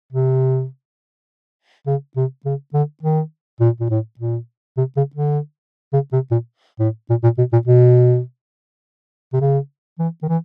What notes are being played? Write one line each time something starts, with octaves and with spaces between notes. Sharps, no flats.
C3
C#3
C3
C#3
D3
D#3
A#2
A#2
A2
A#2
C3
C#3
D3
C#3
C3
A#2
A2
A#2
A#2
B2
A#2
B2
C3
C#3
E3
D#3
E3